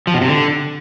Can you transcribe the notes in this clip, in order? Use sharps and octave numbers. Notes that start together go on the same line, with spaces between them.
F3
B2
C3
D3